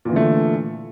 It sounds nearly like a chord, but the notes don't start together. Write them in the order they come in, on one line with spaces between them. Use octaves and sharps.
A#2 E3 D3 A3